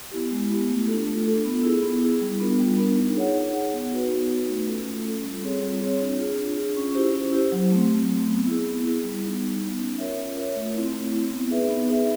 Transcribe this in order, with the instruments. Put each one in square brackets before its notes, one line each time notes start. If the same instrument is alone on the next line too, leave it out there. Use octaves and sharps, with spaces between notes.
[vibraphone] B3 E4 G4
G#3
B3 E4 G4
A3
D4 F4 A4
A3
D4 F4 A4
B3
E4 G#4
B3
E4 G#4
G3
B3 D4 F4 A#4
G3
B3 D4 F4 A#4
D#4
G#4 C#5 F#5
D#4
G#4 C#5 F#5
B3
D#4 F#4 B4
B3
D#4 F#4 B4
A3
C#4 F4 A4
A3
C#4 F4 A4
G3
C4 F4 G#4 C#5
G3
C4 F4 G#4 C#5
D4
F4 G#4
D4
F4 G#4
C#4
E4 G4 C5
C#4
E4 G4 C5
F#3
A3 C4
F#3
A3 C4
B3
E4 G#4
B3
E4 G#4
G3
B3 D#4
G3
B3 D#4
C#4
F4 A#4 C#5 E5
C#4
F4 A#4 C#5 E5
A3
C4 E4
A3
C4 E4
B3
D#4 G#4 B4 E5
B3
D#4 G#4 B4 E5